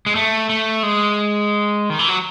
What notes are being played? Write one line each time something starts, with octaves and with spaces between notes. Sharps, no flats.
G#3
A3
A3
G#3
D#3
E3
F#3